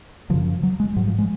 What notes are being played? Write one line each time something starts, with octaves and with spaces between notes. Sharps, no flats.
F#2 C#3 F3
F#3
G#3
G#2 F#3
F3
G#3